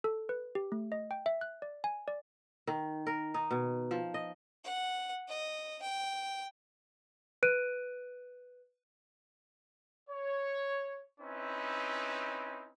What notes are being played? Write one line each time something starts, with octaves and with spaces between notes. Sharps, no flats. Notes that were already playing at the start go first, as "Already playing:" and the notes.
A4
B4
G4
A3
D#5
G5
E5
F#6
D5
G#5
D5
D#3
A#4
D#4
B2
F3
D#5
F#5
D#5
G5
B4 F#6 D7 D#7
C#5
C4 C#4 D#4 E4 B4